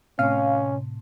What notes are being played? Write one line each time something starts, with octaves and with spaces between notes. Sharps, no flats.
A2 C3 C#4 F5